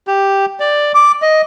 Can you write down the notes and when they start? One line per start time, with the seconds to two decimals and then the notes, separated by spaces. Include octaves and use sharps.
0.07 G4
0.60 D5
0.95 D6
1.22 D#5